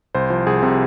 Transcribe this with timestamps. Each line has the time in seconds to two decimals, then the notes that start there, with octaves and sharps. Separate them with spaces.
0.15 C2 C5
0.30 F3
0.47 C2 G#4
0.63 C3